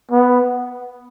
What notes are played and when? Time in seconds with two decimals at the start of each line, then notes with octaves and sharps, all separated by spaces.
0.11 B3